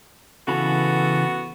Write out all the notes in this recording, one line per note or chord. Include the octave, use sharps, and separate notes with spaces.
C#3 E3 B3 F#4 A4 B5